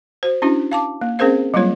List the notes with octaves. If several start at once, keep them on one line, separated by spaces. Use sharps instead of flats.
F#4 C5
C#4 D4 E4 F#4
F5 A5 D6
A#3
C4 C#4 G#4 A#4 C5 F5
F#3 G3 A#3 F4 C#5